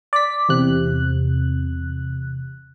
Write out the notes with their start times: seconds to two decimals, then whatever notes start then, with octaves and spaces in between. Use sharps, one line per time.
0.13 D5 B6
0.49 E2 C3 F#6